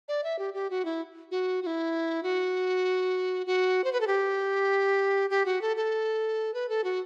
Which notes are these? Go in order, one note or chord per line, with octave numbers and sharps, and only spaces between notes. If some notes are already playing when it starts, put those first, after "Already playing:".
D5
E5
G4
G4
F#4
E4
F#4
F#4
E4
F#4
F#4
C5
B4
A4
G4
G4
F#4
A4
A4
B4
A4
F#4